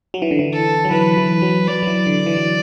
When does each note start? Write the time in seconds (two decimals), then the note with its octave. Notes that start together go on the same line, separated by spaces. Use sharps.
0.14 F#3
0.22 E3
0.31 D3
0.39 E3
0.53 A4
0.85 F#3
0.91 E3 B4
1.17 E3
1.42 F#3
1.68 F#3 D5
1.83 F#3
1.87 E3
2.07 D3
2.26 E3
2.37 F#3